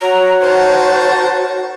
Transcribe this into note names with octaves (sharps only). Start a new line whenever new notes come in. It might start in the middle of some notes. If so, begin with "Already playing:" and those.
F#4 C#5 A#5
D#3 C5 A5